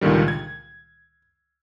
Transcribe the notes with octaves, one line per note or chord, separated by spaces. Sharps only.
C#2 A#2 D3 D#3 G3
G#6